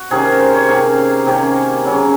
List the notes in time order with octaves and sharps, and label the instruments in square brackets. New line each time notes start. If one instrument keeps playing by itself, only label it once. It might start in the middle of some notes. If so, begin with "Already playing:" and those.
Already playing: [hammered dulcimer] F#4
C3 D#3 A#3 C#4 G#4
A#4
C5
C#5
C3 D#3 A#3 C#4 F5
C3 D#3 A#3 C#4
C#3 F#3 C#4